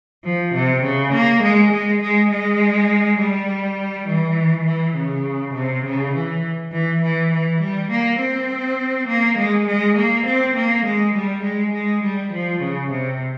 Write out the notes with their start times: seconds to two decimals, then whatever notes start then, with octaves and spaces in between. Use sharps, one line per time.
0.24 F3
0.54 C3
0.83 C#3
1.13 A#3
1.42 G#3
1.72 G#3
2.01 G#3
2.31 G#3
3.18 G3
4.08 E3
4.66 E3
4.96 C#3
5.54 C3
5.84 C#3
6.14 E3
6.72 E3
7.02 E3
7.31 E3
7.61 G3
7.91 A#3
8.19 C4
9.07 A#3
9.38 G#3
9.67 G#3
9.97 A#3
10.26 C4
10.55 A#3
10.85 G#3
11.14 G3
11.43 G#3
11.73 G#3
12.03 G3
12.32 F3
12.61 C#3
12.90 C3